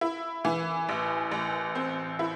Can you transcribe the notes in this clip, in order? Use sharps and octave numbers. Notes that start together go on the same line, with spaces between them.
E4
E3
A1
A1
C4
E4